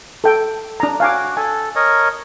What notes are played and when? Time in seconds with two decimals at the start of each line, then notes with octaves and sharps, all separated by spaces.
0.24 A4 G5
0.80 D4 A#5
1.00 F#4 F5 G#5 D6
1.37 A4 G#5
1.76 A#4 C#5 D#5